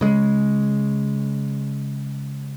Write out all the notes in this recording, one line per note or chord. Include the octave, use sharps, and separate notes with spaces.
C#3 G#3